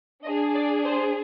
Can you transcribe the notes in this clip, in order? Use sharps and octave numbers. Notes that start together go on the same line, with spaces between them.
D4 G#4 D#5
D5
C5